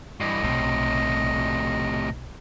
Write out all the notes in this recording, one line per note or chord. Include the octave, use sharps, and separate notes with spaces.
G2 E3 D#5
B1 A2 C3